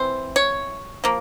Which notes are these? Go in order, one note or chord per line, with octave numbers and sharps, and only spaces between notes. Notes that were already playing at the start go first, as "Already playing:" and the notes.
Already playing: E3 C4 C5
C#5
F3 A#3